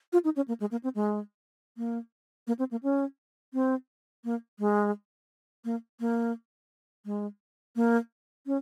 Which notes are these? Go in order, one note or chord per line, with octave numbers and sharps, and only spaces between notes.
F4
D#4
C#4
A#3
G#3
A#3
C4
G#3
A#3
A#3
C4
A#3
C#4
C4
A#3
G#3
A#3
A#3
G#3
A#3
C#4